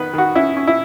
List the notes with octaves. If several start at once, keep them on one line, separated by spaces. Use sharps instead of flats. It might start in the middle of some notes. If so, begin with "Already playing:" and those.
Already playing: D#3 B3 B4
D#3 F#4
C#4 E4
C#4
E4